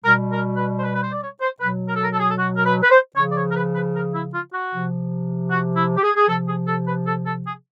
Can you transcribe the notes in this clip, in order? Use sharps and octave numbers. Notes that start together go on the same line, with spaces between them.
B2 G3 A#4
A#4
B4
C5
B4
B4
C5
D5
C#5
C5
B2 F#3 B4
A#4
A4
A#4
A4
G#4
A4
F#4
A#4
B4
B4
C5
C#3 F3 C#5
D5
C#5
A#4
B4
B4
A#4
E4
F4
F#4
C3 F3
F#4
E4
G4
G#4
G#4
C3 F3 A4
G#4
A4
B4
A4
A4
G#4